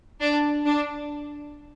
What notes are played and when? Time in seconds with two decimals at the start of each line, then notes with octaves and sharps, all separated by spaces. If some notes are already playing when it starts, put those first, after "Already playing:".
0.21 D4
0.65 D4